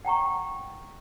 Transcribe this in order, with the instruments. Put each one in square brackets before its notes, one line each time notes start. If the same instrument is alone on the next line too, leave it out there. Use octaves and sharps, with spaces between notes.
[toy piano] F#5 G5 A#5 C#6